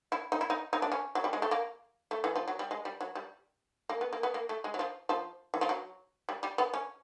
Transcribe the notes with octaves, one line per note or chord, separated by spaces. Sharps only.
E4
D#4
E4
D#4
D#4
D4
C#4
F#3
G3
G#3
A3
A#3
A3
E3
F3
F#3
G3
G#3
G3
F#3
G3
A#3
B3
A#3
B3
A#3
A3
G#3
F#3
F3
F3
E3
F3
F#3
G3
G3
B3
C#4